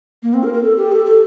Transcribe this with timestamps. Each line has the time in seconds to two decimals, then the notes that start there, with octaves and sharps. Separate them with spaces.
0.23 A#3
0.33 C4
0.43 A#4
0.53 A#4
0.63 A4
0.77 G4
0.91 A4
1.05 A4